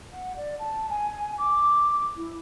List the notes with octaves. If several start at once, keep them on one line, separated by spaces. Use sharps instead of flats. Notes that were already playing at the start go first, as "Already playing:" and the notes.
F#5
D5
A5
G#5
D6
E4